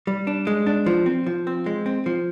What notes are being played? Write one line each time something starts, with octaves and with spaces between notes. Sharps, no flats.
G3
D4
G#3
D4
F3
C4
F3
C4
G#3
C4
F3